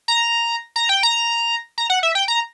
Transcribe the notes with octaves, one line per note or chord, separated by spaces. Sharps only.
A#5
A#5
G5
A#5
A#5
F#5
E5
G5
A#5